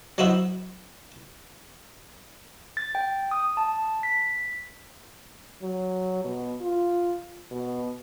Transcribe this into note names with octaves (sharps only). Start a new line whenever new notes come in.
F#3 D#4 E4 F#4 C5 E5
A6
G5
D#6
A5
B6
F#3
B2
F4
B2